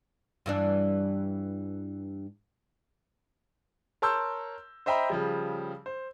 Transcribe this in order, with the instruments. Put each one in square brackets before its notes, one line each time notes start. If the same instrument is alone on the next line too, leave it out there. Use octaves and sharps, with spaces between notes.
[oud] G2 E3 D4
[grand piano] A#4 C#5 A5 C6 E6 G6
C5 D#5 E5 G5 A#5 B5
C#3 F3 G3
C5